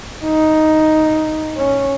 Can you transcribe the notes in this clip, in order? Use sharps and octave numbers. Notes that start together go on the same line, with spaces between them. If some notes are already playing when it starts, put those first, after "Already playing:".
D#4
C#4